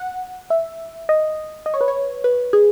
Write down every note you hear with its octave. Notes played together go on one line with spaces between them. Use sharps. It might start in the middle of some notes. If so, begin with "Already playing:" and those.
Already playing: F#5
E5
D#5
D#5
C#5
B4
C#5
B4
G#4